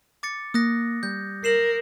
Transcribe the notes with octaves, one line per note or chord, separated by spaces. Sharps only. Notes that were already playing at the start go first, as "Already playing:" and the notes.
D6 A6 C#7
A#3 D#6 F#6 A#6
G3 G6
A#4 C7 E7 F#7